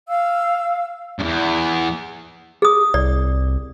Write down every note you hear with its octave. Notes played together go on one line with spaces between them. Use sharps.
F5 E6
E2 G2
G#4 D#6
C2 D5